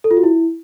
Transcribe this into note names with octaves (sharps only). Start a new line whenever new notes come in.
A4
F4
F#4
E4